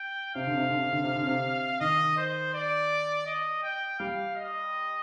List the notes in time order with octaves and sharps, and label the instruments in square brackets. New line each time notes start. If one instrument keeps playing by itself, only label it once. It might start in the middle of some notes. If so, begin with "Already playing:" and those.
Already playing: [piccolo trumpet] G5
[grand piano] C3 [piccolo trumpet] F5
[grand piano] D3
C3
D3
C3
D3
C3
D3
C3
[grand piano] D#3 [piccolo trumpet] D#5
[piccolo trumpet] C5
D5
D#5
G5
[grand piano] G3 [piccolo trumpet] F5
[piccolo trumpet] D#5